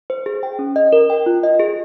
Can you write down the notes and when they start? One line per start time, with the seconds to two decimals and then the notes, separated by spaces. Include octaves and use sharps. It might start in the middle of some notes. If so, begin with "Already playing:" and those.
0.10 C5
0.26 G#4
0.43 G5
0.59 C#4
0.76 D#5
0.93 A#4
1.10 G5
1.26 F4
1.43 D#5
1.59 G#4